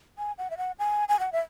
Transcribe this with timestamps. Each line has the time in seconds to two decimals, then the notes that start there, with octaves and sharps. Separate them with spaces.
0.18 G#5
0.38 F#5
0.50 E5
0.57 F#5
0.79 G#5
1.09 G#5
1.20 F#5
1.32 E5